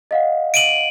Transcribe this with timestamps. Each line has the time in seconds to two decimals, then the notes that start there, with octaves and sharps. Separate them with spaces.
0.11 D#5 F5 F#5
0.54 D7 D#7 F#7